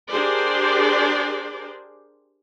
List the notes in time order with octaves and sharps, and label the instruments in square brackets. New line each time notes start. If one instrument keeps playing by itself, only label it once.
[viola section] D4 G4 G#4 A#4 C5 D5